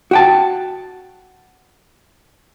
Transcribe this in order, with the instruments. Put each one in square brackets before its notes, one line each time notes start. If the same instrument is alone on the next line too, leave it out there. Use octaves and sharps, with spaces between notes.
[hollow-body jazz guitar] F#4 G5 A5